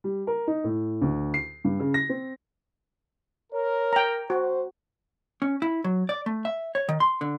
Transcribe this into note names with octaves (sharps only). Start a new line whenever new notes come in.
G3
A#4
D#4
A2
D2
C7
G2
C#3
A#6
C4
A#4 C#5
G5 A#5
F#4 C5
C#4
E4
F#3
D5
A3
E5
C#5
D#3
C6
D3